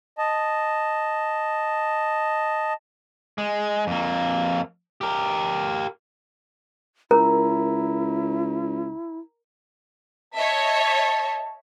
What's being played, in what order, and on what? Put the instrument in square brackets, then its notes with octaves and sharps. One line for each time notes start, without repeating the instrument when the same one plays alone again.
[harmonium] D#5 A5
[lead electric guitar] G#3
F2 A#3
G4 A#4
[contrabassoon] C#2 [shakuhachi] E4 [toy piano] A#4 [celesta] A#5
[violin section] C#5 D#5 E5 [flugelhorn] A5